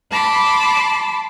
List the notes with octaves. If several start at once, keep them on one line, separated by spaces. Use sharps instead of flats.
A5 B5 C6 D6